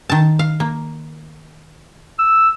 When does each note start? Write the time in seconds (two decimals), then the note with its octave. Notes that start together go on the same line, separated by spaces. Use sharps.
0.10 D#3 A5
0.39 F5
0.60 A#3
2.19 E6